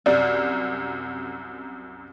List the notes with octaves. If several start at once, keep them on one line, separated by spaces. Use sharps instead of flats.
C2 F#2 D5